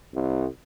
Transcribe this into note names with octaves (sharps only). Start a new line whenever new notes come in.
C2